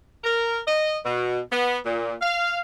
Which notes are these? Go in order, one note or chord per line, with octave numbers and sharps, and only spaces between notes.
A#4
D#5
B2
B3
A#2
F5